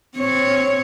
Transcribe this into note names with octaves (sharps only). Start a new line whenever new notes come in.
C4 C#5